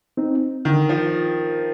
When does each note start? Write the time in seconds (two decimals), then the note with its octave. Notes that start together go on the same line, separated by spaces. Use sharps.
0.17 C4 D#4
0.65 D3 D#3
0.89 F3